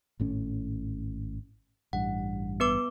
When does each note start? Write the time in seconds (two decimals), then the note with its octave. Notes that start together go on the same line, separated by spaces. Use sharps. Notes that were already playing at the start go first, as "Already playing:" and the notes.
0.20 G#1 A2 C#4
1.93 A1 G2 F#5
2.60 B3 B4 D6